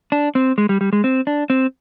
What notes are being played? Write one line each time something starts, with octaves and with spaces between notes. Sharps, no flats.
D4
C4
G#3
G3
G3
G#3
C4
D4
C4